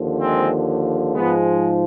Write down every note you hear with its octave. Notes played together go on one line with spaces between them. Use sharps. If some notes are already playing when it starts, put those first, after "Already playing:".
Already playing: D#2 D3 F3
G#3 C4
G#2 F3 G#3 B3